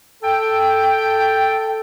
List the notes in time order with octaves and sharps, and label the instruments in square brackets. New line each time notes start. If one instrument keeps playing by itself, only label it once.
[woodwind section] A4 G5